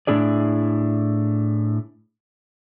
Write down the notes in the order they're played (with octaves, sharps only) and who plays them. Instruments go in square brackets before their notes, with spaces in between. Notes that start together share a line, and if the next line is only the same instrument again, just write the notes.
[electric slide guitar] A2 D4 E4 G#4 D5